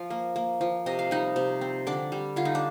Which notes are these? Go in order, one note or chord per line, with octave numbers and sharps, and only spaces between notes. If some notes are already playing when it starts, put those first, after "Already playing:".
Already playing: F3 F4 F5
A#3
A#3
F3
C3 D#5
F5
G3 D#4 D#5
C3
C4
D3 D4 D5
G3
D3 F4
D#4
D4